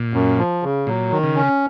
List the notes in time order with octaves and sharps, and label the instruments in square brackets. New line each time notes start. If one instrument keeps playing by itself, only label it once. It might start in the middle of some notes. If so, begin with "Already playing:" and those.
Already playing: [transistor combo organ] A#2
[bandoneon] F#2
F3
C#3
[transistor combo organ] A#2 [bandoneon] F#3
[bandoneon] D#3
[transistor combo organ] C#3
[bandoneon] C#4